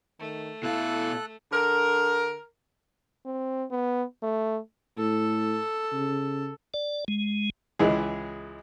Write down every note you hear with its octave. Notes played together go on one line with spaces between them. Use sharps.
D#3 A3
B2 E4 A4 F5 F#6
D3 A#4
C4
B3
A3
A2 A4
C#3
D5
G#3
C#2 E3 G#3 G#4